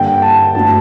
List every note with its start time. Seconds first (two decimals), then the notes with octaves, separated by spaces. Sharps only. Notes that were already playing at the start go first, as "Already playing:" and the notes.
Already playing: G2 D3 G3 A#3 G5
0.22 A5
0.55 G1 G2 F#3 A3 A5